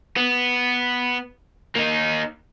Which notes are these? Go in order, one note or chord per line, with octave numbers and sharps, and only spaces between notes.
B3
A#3 D#4